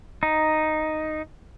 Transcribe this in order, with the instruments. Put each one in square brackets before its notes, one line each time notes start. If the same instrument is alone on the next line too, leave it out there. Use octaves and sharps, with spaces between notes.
[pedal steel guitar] D#4